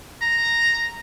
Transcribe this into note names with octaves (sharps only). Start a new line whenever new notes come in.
A#5